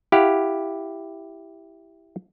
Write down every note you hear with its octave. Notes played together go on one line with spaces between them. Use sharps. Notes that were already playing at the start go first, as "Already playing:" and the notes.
E4 G4 F5 F#5